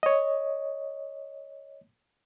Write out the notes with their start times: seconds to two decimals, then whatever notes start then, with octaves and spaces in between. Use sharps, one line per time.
0.03 C#5 D#5